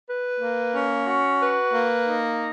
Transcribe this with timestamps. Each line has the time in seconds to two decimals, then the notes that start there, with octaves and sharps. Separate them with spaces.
0.08 B4
0.41 A#3
0.74 C#4
1.07 F#4
1.40 B4
1.72 A#3
2.05 D#4